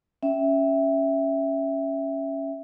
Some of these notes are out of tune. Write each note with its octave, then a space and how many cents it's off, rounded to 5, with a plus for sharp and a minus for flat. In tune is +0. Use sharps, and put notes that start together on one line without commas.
C#4 +0 E5 +0 G5 -15